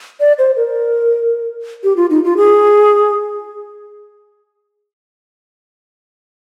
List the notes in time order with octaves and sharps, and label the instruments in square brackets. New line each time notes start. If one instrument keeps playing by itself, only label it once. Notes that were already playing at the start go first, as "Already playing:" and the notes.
[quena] D5
C5
A#4
G4
F4
D#4
F4
G#4